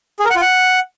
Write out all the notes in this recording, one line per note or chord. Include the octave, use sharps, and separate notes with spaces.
G#4
A#4
F#5
F4
F#5